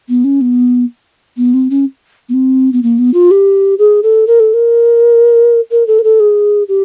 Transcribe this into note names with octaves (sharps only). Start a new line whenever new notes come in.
B3
C#4
B3
B3
C4
C#4
B3
C4
B3
A#3
B3
F4
G4
G#4
A4
A#4
A4
A#4
A#4
A4
A#4
A4
G#4
G4